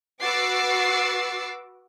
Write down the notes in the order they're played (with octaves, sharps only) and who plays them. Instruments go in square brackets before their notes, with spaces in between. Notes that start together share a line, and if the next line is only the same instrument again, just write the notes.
[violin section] F#4 B4 D6 E6 A6 C7